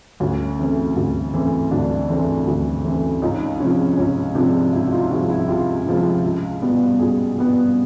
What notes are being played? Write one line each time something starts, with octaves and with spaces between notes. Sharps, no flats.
D2 C#4
C#3 E3 A3 C4
D2
C#3 E3 A3 C4
D2 D4
C#3 E3 A3 C4
D2
C#3 E3 A3 C4
C#2 C#4 D#4
C3 F3 G#3 C#4
C#2 C#4
C3 F3 G#3 D4
C#2 D4 E4
F#4
D#4 F4
C3 F3 G#3 E4 F#4
E4 F#4
C#2 F4 G4
C3 F3 G#3
C#2
B2 G3 B3
C#2 F#4 G#4
B2 G3 B3